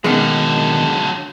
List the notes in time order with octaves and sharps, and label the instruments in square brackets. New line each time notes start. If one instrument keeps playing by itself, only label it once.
[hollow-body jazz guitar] B2 D#3 G#3 [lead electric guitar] D3 F#3